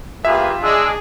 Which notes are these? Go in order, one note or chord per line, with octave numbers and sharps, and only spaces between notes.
A#3 F4 G4 G#4 B4 E5
G#3 D4 G#4 E6